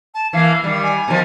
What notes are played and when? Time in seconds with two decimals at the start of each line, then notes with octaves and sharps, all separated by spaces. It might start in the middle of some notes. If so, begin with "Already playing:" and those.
0.14 A5
0.33 E3 A#3 F5
0.64 D#3 G3
0.83 G#5
1.08 B2 D#3 F3